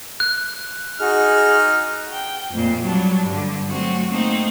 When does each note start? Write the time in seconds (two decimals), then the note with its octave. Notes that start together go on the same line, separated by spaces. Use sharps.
0.20 F#6
1.00 D#4 F#4 G#4 F6
2.13 G5
2.50 F2 A#2
2.82 F#3 G3 D4
3.25 G2 D3
3.69 F#3 A3 C4 F#4
4.09 A3 A#3 C4 D#4